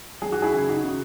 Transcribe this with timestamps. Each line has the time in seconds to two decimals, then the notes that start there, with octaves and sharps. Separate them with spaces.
0.22 F#3 G#4
0.32 F#4
0.42 E4 G#4
0.53 C#3
0.69 D#4 F#4
0.84 C#3